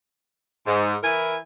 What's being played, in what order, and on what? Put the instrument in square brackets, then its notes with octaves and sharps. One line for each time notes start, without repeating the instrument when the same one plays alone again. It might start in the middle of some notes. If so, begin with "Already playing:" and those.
[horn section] G#2
E3 E4 A#4 G#5